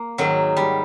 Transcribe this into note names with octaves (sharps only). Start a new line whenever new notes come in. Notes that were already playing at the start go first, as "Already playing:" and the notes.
Already playing: A#3
G#2 D#3 F#3
G3